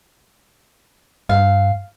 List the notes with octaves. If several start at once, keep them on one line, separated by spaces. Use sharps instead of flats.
G2 F5